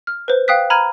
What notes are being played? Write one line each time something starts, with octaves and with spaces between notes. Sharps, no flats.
F6
B4 C5
F5 G5 D#6 F#6 B6
A#5 B5 F6 G#6 D#7